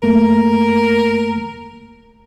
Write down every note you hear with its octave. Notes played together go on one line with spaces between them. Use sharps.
F#2 A3 A#3 A#4